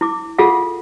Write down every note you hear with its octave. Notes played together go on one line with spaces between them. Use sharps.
E4 D6
F4 G#4 A4 F5 F#5